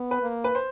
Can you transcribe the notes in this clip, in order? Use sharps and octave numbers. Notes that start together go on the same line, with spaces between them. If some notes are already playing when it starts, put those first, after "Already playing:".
Already playing: B3
B4
A#3
B4
C5